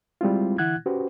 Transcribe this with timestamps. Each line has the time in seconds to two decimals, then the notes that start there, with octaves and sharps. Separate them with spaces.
0.21 G3 G#3 C4 E4 F4
0.58 D3 E3 E4 F#5 F#6 G#6
0.86 C#4 F#4 G4 B4 C5